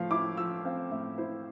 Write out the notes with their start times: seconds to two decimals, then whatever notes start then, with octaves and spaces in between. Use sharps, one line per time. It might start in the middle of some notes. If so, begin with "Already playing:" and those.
Already playing: A2 F3 F5
0.11 E4 D6
0.37 F3 E6
0.65 C4 F5
0.91 A2 E5
1.18 E4 C5